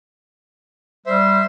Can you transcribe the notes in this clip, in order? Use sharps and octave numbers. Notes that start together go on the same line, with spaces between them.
G3 C5 E5